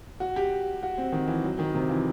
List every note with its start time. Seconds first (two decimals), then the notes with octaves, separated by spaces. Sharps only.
0.20 F#4
0.36 G4
0.83 F#4
0.98 C4
1.12 D#3
1.28 E3
1.44 F#3
1.59 D#3
1.74 C3
1.89 E3